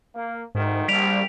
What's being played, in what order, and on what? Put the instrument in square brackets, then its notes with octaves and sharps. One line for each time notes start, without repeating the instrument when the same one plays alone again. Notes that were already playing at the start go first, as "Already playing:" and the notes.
[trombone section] A#3
[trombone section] D2 D#3 [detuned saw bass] G#2
[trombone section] A#1 [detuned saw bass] G3 [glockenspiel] B6 D7 F7